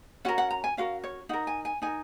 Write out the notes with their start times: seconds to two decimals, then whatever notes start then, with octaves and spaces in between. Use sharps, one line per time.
0.25 C#4 F#4 A#4 F#5
0.38 F#5
0.51 A#5
0.64 G#5
0.77 C#4 F#4 A#4 F5
1.04 C#5
1.29 D#4 A#4 F#5
1.47 G#5
1.65 G#5
1.82 D#4 A#4 G#5